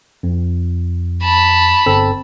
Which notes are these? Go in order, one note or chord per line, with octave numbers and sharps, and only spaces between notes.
F2
A5 B5
G1 C4 A4